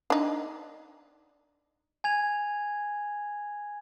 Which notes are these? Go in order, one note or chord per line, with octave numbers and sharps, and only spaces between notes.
D4 D#4
G#5 G#6 F7